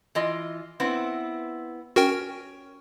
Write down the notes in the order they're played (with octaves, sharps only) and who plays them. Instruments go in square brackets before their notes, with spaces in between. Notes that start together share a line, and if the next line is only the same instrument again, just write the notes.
[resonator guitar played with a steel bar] E3 F4 D#5
B3 C4 E4
[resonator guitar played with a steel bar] C#4 [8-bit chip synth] F#4 A#4 G5